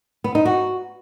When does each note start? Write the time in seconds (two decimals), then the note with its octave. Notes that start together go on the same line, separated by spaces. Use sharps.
0.24 B3
0.35 D#4
0.45 F#4